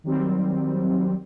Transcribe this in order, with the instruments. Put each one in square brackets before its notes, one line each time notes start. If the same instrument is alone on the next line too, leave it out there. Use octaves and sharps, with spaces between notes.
[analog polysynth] D#3 F#3 G3 C4